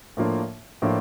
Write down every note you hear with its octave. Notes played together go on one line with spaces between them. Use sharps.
A2 F3 A#3 D4 F4
A2 F3 A#3 D4 F4